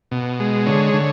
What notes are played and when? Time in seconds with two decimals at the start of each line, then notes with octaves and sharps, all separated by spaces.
0.11 B2
0.40 G#3
0.66 D3 C#5
0.94 D3